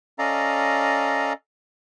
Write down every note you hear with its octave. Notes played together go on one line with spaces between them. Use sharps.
C#4 A4 D5 D#5 F5 A#5